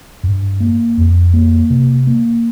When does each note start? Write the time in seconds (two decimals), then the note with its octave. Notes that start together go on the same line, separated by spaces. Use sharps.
0.23 G2
0.60 A#3
0.97 F2
1.34 A#3
1.70 C3
2.07 A#3